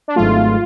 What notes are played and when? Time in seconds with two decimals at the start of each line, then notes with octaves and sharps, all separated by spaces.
0.08 D4
0.16 G#1 G#2 F#3 A3 F4